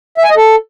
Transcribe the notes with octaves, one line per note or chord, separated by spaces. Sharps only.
E5
G#5
D#5
A4